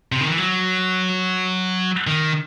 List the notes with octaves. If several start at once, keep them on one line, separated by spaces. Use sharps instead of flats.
C3
D#3
E3
F#3
D#3